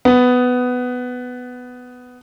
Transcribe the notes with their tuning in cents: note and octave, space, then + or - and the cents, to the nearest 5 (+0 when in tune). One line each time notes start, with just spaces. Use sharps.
B3 +10